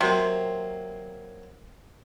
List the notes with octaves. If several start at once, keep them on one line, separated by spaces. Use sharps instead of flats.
C3 F#3 A#3 C4